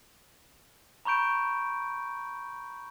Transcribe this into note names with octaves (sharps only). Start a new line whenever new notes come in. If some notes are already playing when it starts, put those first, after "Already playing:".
A#5 B5 C#6 G6 D7